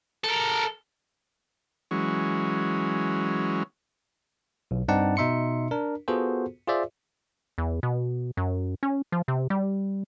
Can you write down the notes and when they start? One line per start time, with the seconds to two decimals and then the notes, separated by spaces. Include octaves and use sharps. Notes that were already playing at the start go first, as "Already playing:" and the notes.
0.24 A4 A#4
1.91 E3 F#3 G#3 C#4
4.71 B1
4.88 G2 C4 D#4 D5 F#5 A5
5.17 B2 D#4 E5 C6 C#7
5.71 D4 A#4
6.08 B3 F4 F#4 G#4 A4 C5
6.67 F4 G#4 C5 D5 E5
7.58 E2
7.83 B2
8.37 F#2
8.83 C#4
9.12 F3
9.28 C3
9.50 G3